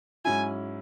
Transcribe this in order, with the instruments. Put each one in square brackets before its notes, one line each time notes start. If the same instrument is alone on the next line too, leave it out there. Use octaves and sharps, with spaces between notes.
[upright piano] G#2 F#3 C#4 E4 [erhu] G#5